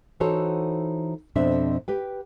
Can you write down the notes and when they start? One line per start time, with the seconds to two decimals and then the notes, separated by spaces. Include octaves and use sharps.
0.20 E3 D#4 F#4 A4 C5 C#5
1.36 F2 B2 C4 D4 E5
1.88 G4 B4 G5